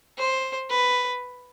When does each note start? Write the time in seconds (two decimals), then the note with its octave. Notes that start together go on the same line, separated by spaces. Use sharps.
0.18 C5
0.70 B4